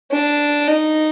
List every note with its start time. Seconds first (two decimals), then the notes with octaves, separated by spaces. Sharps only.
0.12 D4
0.68 D#4